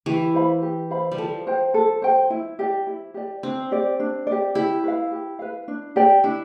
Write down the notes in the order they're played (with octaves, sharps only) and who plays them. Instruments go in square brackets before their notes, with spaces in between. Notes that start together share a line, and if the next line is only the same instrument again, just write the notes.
[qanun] E3 [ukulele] G4
[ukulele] C5 F5 B5
G4
C5 F5 B5
[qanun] G3
[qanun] F3 [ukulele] A4
[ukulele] C5 G5
A4
C5 G5
E4
G4 D5
E4
G4 D5
[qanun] C4 [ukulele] D4
[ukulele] G4 D5
D4
G4 D5
[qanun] E4 [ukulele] G4
[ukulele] B4 F5
G4
B4 F5
D4
G4 D5 G5
[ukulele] D4 [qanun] E4